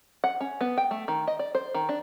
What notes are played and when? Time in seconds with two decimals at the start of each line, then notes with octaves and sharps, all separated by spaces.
0.24 F#5
0.41 C#4
0.61 B3
0.78 G5
0.91 A3
1.08 D#3
1.27 D#5
1.39 D5
1.55 C5
1.74 D#3
1.89 D4